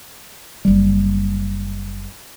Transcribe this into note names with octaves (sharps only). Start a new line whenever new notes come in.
F#1 G3